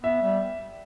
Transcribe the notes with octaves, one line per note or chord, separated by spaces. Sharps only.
B3 E5
G3